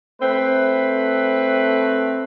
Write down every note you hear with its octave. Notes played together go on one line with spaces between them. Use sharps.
A3 C4 B4